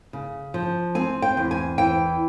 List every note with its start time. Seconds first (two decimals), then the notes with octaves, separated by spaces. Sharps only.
0.13 C#3
0.54 F3
0.95 C4 G#5
1.22 G5
1.37 E2
1.51 G#5
1.78 E3 G5